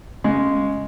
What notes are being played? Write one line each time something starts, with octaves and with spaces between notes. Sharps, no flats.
C#3 G#3